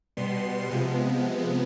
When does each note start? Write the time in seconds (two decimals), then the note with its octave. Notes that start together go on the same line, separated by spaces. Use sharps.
0.17 B2 G3 B3 C6
0.70 C3 F3 G#3 B3